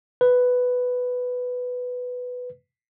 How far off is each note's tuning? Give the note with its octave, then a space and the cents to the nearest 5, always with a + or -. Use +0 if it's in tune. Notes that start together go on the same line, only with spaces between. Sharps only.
B4 +5